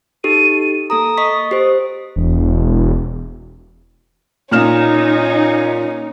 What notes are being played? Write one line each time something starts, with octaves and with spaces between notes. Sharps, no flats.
D#4 G4 A4 D#7
A#3 A4 A#5 D#6
D#5 C#6 B6
G4 C5 D#6
E1
A#2 C#4 D#4 F6 E7